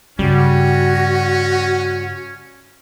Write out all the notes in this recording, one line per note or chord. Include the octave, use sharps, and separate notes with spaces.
G2 C#3 G3 C#4 F#4